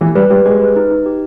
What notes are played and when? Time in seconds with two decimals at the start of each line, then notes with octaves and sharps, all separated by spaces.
0.01 E3 G4
0.15 G3 B4
0.30 G3 G4
0.45 G#3 G4
0.61 B4
0.76 D#4
0.91 D#4
1.06 G4